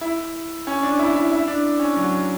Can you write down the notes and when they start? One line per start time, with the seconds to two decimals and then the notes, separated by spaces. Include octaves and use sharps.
0.01 E4
0.67 C#4
0.83 D4
0.99 E4
1.15 E4
1.31 E4
1.48 D4
1.80 C#4
1.97 F#3